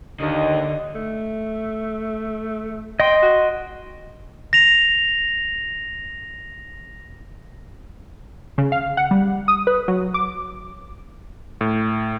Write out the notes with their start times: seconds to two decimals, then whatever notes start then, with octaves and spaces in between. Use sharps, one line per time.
0.20 D#2 D3 D#3 D#5
0.95 A3
3.00 D#5 G5 C6
3.22 F#4
4.53 A#6 F7
8.58 C#3
8.72 F5
8.97 F#5
9.11 G3
9.48 D#6
9.67 B4
9.88 F#3
10.14 D6
11.61 A2